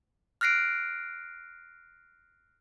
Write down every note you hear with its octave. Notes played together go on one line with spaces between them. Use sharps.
F6 F#6 A#6 C7 D7